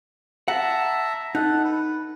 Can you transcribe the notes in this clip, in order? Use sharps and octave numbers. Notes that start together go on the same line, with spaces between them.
E5 F#5 A5 A#5
D#4 A4 F#5
B4